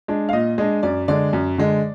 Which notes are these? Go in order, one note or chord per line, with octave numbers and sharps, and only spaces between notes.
G#3 D4
F5
A#2 D#5
G#3 D4 D#5
F#2 D5
D3 G#3 D5
F#2
D3 G#3